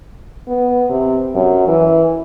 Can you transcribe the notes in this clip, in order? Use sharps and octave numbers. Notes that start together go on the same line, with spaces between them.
B3
C3
F#2
E3